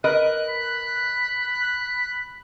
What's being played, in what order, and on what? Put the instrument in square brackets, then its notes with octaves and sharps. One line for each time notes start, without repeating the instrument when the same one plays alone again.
[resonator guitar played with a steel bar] A#4 B4 D#5 [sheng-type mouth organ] F#6
[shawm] B5